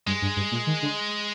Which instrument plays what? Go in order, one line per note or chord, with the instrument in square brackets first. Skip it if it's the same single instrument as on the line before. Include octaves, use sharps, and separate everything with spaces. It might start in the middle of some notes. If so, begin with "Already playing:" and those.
[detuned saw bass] G2 [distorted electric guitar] G#3
[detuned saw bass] G2
G2
A#2
D#3
D3